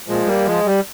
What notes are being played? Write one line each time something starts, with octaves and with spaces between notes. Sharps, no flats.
A#2 F3 G#3
G3 A#3
F3 G#3
G3